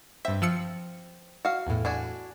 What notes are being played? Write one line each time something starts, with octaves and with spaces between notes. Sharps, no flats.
G2 C4 E5
F3 E6 C#7
F#4 F5
E2 A2
D4 F#4 G#5